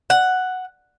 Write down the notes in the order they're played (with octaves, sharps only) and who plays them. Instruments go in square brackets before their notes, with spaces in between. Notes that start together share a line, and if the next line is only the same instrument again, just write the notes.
[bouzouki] F#5